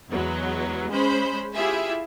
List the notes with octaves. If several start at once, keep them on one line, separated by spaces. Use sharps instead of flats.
E2 F#3 G#3 B3
G#3 C#4 C5 B5 G6
E4 F4 G4 G#4 E5 G#5